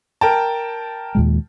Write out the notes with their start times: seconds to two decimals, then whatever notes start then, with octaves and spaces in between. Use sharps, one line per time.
0.21 A#4 G5 A5
1.15 D#2 A#2 G#3